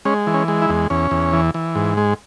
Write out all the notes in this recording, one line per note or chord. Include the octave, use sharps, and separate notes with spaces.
G#3 C#4
E3
C#4
G#3
E4
E2
E2 C#4
E2
E3
E3
G#2
G#3